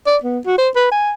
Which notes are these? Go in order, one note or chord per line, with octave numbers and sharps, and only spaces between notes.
D5
B3
F#4
C5
B4
G#5